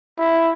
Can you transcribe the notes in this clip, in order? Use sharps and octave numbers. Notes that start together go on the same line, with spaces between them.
E4